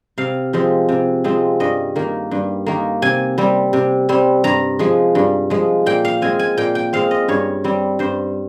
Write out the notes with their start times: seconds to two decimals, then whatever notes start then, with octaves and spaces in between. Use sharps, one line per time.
0.18 C3 F5
0.53 F3 G#3 C4
0.89 C3
1.24 F3 G#3 C4
1.60 G2 D#5
1.96 D#3 A#3
2.31 G2
2.66 D#3 A#3
3.02 C3 G#5
3.38 G3 C4
3.73 C3
4.09 G3 C4
4.44 G2 A#5
4.79 F3 G#3
5.15 G2
5.50 F3 G#3
5.86 A#2 G5
6.05 F5
6.22 G#3 C4 G#5
6.39 G#5
6.57 A#2 G5
6.75 G5
6.93 G#3 C4 F5
7.11 D#5
7.28 G2 C#5
7.64 G3 C4
7.99 G2 C5